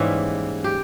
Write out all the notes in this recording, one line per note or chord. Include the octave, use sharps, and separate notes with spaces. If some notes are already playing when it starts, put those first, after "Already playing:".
Already playing: G#2 E3 G3 A#3 C#4 E4
G4